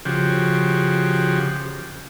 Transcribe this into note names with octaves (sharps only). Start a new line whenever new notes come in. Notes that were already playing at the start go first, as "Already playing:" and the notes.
C#3 F3 F#4 G4